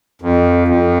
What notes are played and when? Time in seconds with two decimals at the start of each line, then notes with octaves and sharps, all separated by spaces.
0.22 F2
0.68 F2